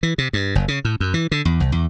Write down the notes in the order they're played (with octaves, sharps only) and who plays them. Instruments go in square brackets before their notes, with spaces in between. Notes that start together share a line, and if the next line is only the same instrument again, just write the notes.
[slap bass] E3
C3
G2
F#1
C#3
A2
F#2
E3
D3
E2
C2
E2